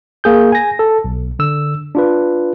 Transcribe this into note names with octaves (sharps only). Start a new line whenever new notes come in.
A#3 G#4 G6
G#5 A#6
A4
B1
D3 E6
D4 F4 B4